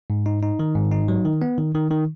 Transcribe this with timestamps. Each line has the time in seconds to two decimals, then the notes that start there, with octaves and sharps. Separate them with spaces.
0.10 G#2
0.26 D#4
0.43 D#4
0.59 D#3
0.75 G#2
0.91 D#4
1.08 F#3
1.25 D#3
1.42 B3
1.58 D#3
1.75 D#3
1.91 D#3